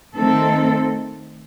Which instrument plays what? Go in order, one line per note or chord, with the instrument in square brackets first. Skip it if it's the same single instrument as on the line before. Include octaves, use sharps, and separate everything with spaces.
[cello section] D#3 A3 C4 A4